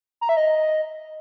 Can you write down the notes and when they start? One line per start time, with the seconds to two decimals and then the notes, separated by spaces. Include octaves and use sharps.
0.21 A#5
0.29 E5
0.37 D#5